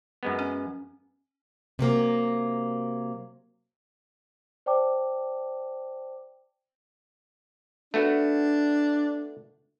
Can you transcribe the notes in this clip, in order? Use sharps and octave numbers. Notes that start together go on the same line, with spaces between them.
F#2 G#3 B3
C#4
C3 F#3 A#3
C5 D5 G5 A5 D6
A3 B3 D4 F#4